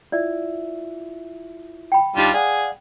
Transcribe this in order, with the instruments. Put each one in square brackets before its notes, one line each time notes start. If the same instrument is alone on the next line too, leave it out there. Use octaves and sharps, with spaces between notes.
[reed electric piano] E4 F4 E5 [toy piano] D5
[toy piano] G5 B5
[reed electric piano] D2 D#4 G4 [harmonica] G3 D4 F4
[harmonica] G#4 [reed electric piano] D5 F5 F#5